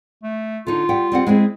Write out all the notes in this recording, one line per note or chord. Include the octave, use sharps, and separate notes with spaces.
A3
D3 D#4 F4
G3 F#5 G5
G3 C4 F#5
G#3 C4 E4 G#4